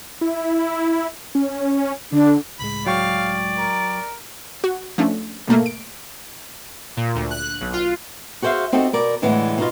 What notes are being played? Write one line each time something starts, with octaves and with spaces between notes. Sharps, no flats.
E4
C#4
D3 D4
C#2 A2 G#3 B5
F#3 D5 F5 G5 C#6
A#4
F#4
F3 A3 C#4 D4
G#2 B2 A3 A#3
D7
A#2
D2
F#6
B1
F4
F#4 G#4 C5 C#5 E5 F5
C4 D#4 F#4 G4 A4
B2 A#4 D5
A2 D3 E3 G#3 B3
B2 D#4 F4